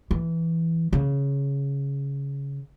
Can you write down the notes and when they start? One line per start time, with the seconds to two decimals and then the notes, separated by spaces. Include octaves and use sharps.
0.11 E3
0.93 C#3